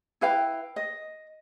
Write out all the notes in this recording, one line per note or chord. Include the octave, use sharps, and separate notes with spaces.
E4 B4 F5 G5
D#5